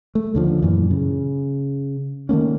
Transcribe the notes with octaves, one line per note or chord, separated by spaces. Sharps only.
A3
D#2 D3 F3
F#2 A#2 E3
C#3
D#3 A3 A#3 C#4